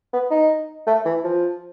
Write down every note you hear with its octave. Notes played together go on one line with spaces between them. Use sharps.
B3
D#4
A3
E3
F3